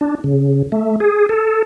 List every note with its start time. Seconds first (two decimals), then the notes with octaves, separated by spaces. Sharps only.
0.01 D4
0.24 C#3
0.72 A3
1.00 G#4
1.29 A4